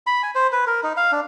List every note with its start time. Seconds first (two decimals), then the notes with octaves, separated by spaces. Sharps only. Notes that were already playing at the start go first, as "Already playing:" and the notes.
0.07 B5
0.23 G#5
0.35 C5
0.52 B4
0.67 A#4
0.83 D#4
0.97 F5
1.12 D4